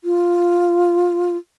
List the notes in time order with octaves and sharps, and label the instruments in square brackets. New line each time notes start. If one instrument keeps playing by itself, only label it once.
[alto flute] F4